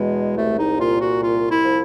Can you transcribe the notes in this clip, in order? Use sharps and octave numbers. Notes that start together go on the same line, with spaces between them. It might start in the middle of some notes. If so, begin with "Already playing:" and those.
Already playing: E2 B2 G#3
C2 A3
D#4
A#2 F4
F#4
C2 F4
E4
F3